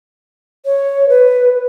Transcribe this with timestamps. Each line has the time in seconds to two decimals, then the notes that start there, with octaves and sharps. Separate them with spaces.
0.65 C#5
1.09 B4